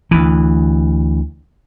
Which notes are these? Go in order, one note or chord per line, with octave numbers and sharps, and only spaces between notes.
D2 E3